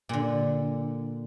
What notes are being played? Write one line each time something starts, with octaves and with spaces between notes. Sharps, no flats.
A#2 D3